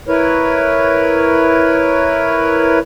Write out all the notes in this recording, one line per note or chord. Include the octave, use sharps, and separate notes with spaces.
E4 A#4 B4 C#5